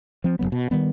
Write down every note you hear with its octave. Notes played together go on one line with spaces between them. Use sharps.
F3 C4
F#1 F#2 F#3 B3
B2
D#3 G3 B3